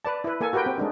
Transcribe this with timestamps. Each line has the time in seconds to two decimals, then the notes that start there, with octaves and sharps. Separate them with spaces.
0.05 B4 D5 A5
0.24 E4 B4
0.40 A#3 A4 G#5
0.53 F#4 G4 A#4 B4 G5
0.66 C4
0.78 G#3 D4 D#4